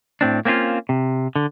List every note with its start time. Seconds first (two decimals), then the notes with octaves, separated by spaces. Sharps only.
0.21 A2 C4 D4
0.45 A#3 C4 C#4 E4 F4
0.89 C3
1.36 D3